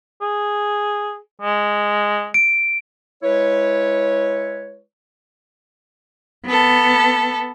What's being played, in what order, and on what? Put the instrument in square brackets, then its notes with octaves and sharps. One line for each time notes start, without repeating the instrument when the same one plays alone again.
[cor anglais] G#4
G#3
[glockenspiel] D7
[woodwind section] G#3 E4 B4 C#5
[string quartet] B3 A4